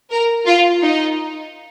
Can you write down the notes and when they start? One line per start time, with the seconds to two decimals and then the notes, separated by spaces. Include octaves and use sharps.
0.10 A#4
0.46 F4
0.82 D#4